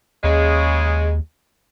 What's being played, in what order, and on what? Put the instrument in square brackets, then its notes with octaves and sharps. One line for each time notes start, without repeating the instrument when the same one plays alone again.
[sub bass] D#2 [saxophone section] C#3 G#3